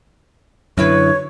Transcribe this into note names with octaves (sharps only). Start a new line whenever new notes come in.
F#2 D3 F#3 E4 B4 C#5